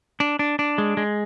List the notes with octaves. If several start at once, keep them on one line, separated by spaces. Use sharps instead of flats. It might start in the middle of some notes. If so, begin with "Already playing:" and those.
D4
D4
D4
G#3
G#3